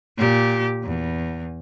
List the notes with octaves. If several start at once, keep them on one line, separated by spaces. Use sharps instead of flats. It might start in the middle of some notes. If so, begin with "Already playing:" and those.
A#2 G4
E2